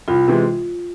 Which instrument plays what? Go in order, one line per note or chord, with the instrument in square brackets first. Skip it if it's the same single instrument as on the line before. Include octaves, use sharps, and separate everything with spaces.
[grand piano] C2 [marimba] F4
[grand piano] C3 E3 G#3